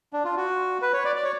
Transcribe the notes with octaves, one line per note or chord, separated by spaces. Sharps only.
D4
F4
F#4
B4
C#5
D5
D5
C#5